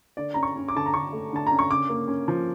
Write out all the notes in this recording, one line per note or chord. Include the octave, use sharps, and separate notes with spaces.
D3 D5
C#4 A#5
C#6
C#4
D6
D3 A5
A#5
D3 C#6
A3
D3 A5
C#4 A#5
C#6
C#3 D6
A#3
C#4
F3